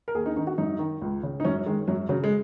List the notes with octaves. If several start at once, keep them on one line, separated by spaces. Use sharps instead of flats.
A#4
D#2 G#4
D#4
D#3 D#4
F#4
F#2 D#4
D#3
C#2
C#3
D#4
F#2 C#4
D#3 G#3
F#2 F#3
C#3 F#3
G#3